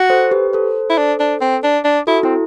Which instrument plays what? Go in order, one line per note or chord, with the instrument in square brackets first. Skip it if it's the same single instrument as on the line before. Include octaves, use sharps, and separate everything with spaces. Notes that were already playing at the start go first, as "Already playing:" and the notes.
Already playing: [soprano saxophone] F#4
[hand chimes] A4 C5
G4 B4
A4 C5
[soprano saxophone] E4
D4
D4
C4
D4
D4
[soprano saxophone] E4 [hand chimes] F#4 A4
[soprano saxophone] C4 [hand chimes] E4